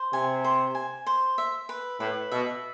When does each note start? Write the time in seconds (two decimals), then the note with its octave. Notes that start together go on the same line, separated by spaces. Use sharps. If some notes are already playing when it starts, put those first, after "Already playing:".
Already playing: C5
0.13 C3 G#5
0.44 C5
0.75 G#5
1.06 C5
1.38 E5
1.69 B4
2.00 A2 B4
2.31 B2 E5